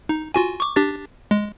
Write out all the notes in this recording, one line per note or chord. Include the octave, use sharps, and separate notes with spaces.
D#4
F4 F#4 G#5
C#6 D6
D4 G4 A6
G#3